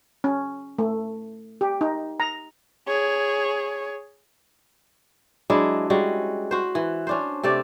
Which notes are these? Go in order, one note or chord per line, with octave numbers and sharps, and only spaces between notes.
C#4
A3
G4
D#4
A#5
G#4 C#5
F#3 G#3 D4 E4
G3 G#3 C#4 F#4
F#4 C5
E3
C#4 D4 C5
C3 A3 A4 D5